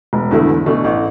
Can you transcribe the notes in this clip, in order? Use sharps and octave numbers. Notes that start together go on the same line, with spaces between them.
E1
E2 D3 A3 E4
E2
B2 A3 D4
A1